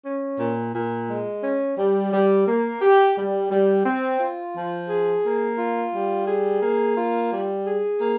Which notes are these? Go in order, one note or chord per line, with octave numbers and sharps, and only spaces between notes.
C#4
A#2
A#2
G#3
C#4
G3
G3
A#3
G4
G3
G3
C4
F4
F3
G#4
A#3
F4
G3
G#4
A#3
F4
G3
G#4
A#3